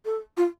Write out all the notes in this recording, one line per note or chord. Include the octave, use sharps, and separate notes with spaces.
A4
F4